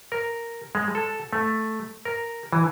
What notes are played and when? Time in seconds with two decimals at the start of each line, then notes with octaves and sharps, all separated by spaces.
0.12 A#4
0.75 G#3
0.95 A4
1.33 A3
2.05 A#4
2.53 E3